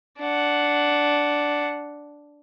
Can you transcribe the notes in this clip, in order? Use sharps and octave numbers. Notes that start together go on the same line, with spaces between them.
D4 F#5